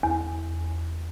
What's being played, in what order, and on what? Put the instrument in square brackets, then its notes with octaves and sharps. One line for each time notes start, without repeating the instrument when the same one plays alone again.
[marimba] E2